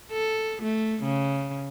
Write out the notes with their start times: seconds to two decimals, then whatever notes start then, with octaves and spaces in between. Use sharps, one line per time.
0.12 A4
0.62 A3
1.04 C#3